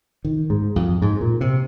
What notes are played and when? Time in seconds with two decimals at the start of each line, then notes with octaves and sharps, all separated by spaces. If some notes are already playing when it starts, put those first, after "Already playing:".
0.25 D#3
0.50 G#2
0.76 F2
1.02 G#2
1.21 A#2
1.41 C3